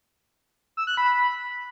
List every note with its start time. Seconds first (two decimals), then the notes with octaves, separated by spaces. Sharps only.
0.77 E6
0.87 F#6
0.97 B5